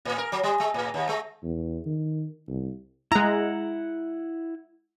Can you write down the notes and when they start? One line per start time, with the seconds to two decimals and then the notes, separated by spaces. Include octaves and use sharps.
0.05 A2
0.18 A#4
0.32 F#3
0.43 G3
0.60 G#3
0.74 A2
0.94 D#2
1.09 G#3
1.43 E2
1.86 D#3
2.48 C2
3.12 G#3 E4 F#5 A#5